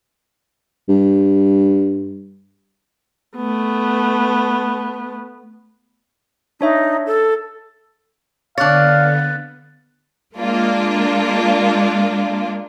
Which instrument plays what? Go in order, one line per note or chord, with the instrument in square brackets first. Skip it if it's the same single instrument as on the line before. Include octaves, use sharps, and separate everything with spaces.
[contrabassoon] G2
[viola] A3 B3
[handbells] D4 C#5 E5 [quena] D#4
[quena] A4
[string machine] D3 B3 [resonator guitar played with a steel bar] D4 C#5 [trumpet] F5 [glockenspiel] F#6 A6
[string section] G#3 A#3 D4 F4